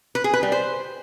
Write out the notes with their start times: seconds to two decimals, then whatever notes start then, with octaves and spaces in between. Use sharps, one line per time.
0.15 B4
0.24 G#4
0.33 B4
0.43 G3
0.52 C5